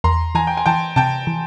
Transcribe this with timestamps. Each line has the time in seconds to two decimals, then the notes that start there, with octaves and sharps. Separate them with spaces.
0.04 E2 A#5 C6
0.35 E3 G#5 A#5
0.47 G5
0.57 G#5
0.66 E3 G5 A5
0.96 C3 G5 A5
1.27 E3